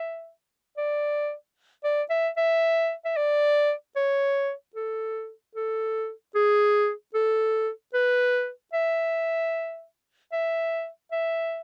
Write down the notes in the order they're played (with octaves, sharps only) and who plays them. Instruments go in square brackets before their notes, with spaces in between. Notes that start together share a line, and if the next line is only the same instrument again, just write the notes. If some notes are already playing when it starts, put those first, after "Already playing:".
Already playing: [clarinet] E5
D5
D5
E5
E5
E5
D5
C#5
A4
A4
G#4
A4
B4
E5
E5
E5